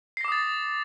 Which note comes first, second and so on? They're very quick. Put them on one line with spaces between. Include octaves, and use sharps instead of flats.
C7 A#6 D6 D#6 A6